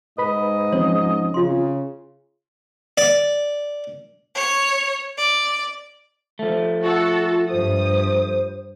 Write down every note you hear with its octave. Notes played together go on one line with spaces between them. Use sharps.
G#2 B4 D#5 B5
F3 C4 C#4 C#5
C#3 F4 C6
D5
C#5
D5
F3 A3
F4 F#4 A4
G2 C5 D#6